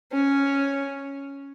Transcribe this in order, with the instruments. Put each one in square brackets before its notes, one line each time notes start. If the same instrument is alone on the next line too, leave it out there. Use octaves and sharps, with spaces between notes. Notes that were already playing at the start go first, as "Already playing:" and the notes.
[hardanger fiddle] C#4